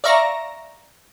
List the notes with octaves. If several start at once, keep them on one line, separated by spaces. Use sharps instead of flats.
D5 E5 F5 A#5 C#6 A#6